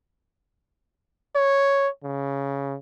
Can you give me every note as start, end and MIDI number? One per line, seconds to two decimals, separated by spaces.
1.36 1.88 73
2.04 2.76 49